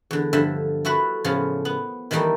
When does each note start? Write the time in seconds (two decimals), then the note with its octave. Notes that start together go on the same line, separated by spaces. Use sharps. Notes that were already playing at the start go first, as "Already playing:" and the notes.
0.11 E2 D3
0.33 G2 D3 F3 E5
0.85 A3 E4 F#4 A4 B4
1.24 A2 C#3 F3 B3 F4
1.65 B3
2.11 D#3 E3 G3 A3 A#3 D#4